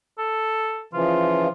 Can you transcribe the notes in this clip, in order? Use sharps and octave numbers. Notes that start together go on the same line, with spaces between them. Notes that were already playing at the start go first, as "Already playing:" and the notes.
A4
C#3 E3 F3 F4